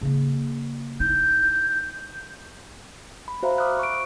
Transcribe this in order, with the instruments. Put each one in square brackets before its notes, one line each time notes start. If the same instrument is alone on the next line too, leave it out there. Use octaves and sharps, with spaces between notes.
[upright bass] C#3 A#3
[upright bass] D#4 E4 [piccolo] G6
[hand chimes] B5
F#4 C5 E5 F5 A#5 B5
B5 D6 D#6 F6 F#6
C#6 D7